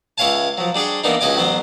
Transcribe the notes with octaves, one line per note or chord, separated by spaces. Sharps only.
C#2 E4 C#5 F5 G#5 A5
F3 F#3
G3 D4 G#4 G5 C#6
E3 A#3 B3 D4 D#4
C#2 C#3 F#4 D#5 G#5 D6
A1 F#3 B3 C5